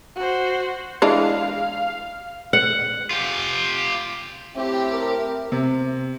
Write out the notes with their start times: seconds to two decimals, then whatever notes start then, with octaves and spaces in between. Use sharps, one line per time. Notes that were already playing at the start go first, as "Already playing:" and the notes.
0.16 F#4 C5
1.02 E3 G#3 D4 F5
2.53 F#5
3.11 F4 G4
4.55 A2 C4 G4 E5
4.92 A#4
5.52 C3